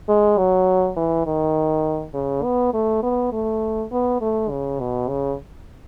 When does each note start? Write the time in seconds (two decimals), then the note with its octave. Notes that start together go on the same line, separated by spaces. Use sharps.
0.09 G#3
0.38 F#3
0.97 E3
1.27 D#3
2.14 C#3
2.44 B3
2.74 A3
3.03 B3
3.32 A3
3.92 B3
4.21 A3
4.50 C#3
4.80 B2
5.09 C#3